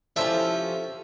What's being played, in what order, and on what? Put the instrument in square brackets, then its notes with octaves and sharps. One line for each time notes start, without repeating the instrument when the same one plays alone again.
[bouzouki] F3 C#4 G4 [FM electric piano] E4 A4 C5 [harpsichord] E5